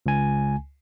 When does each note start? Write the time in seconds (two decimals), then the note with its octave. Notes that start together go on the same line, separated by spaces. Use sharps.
0.06 C#2 G#5